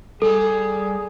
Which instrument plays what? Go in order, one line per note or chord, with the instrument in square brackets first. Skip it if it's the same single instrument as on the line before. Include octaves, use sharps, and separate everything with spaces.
[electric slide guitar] G3 G5 [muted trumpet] G#4 [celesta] A4